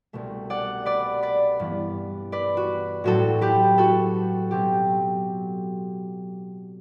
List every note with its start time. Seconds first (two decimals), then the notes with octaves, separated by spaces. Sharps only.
0.13 C2 B2 A3
0.50 D5 F#5
0.86 B4 D5
1.23 B4 D5
1.60 G2 E3 B3
2.32 B4 D5
2.57 F#4
3.04 A2 F#3 C4 F#4 A4
3.41 G4 B4
3.78 F#4 A4
4.51 B2 F#3 C4 G4